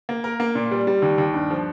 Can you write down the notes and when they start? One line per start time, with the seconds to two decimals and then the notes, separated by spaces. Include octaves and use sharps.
0.09 A#3
0.24 A#4
0.40 A#3
0.55 A#2
0.71 G3
0.87 G3
1.02 D#2
1.18 D#2
1.34 G2
1.50 F3